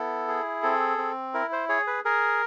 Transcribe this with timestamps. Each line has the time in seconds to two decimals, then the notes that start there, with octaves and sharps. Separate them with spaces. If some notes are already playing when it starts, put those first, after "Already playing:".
Already playing: B3 E4 A4
0.28 G#4
0.62 C4 A4
0.98 C4
1.34 E4 A#4
1.52 C5
1.69 G#4 C#5
1.87 B4
2.05 G#4 A#4